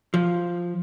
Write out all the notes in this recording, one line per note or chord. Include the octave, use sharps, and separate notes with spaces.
F3